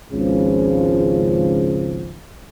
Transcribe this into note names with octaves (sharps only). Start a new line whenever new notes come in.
G#1 C#2 C#3 F3